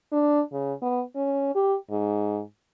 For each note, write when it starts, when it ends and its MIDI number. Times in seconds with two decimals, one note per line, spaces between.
0.12 0.41 62
0.52 0.73 49
0.82 1.03 59
1.15 1.53 61
1.55 1.77 67
1.91 2.40 44